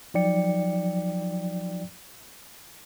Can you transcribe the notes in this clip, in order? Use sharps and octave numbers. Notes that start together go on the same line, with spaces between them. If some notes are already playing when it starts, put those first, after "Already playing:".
F3 F#3 D#4 D5 G5 C#7